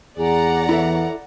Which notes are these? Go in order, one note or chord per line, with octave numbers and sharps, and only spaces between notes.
E2 G#4 D5 F#5 A#5
E3 E4 A4 E5